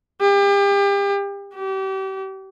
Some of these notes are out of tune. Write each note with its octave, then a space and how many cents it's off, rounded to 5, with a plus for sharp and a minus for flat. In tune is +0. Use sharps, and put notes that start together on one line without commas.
G4 +35
G4 -35